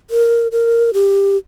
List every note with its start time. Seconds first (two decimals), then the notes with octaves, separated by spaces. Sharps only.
0.10 A#4
0.52 A#4
0.94 G4